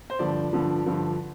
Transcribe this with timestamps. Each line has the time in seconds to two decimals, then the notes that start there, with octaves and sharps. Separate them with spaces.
0.10 C5
0.19 G2 D3 F3 D5
0.53 G2 D3 F3
0.86 G2 D3 F3